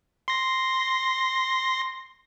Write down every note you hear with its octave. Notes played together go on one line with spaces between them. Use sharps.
C6 A#6